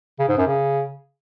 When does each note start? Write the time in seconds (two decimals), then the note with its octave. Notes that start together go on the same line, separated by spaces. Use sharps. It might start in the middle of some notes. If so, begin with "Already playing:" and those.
0.19 C#3
0.28 G#2
0.38 F#2
0.47 C#3